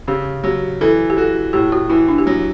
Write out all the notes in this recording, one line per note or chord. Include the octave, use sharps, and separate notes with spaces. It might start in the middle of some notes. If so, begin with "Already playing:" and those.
C#3 G4
F#3 G4
E3 A4
G4
F#4 A4
A2 G4
F#4
E3 E4
D4
G4
F#3 F#4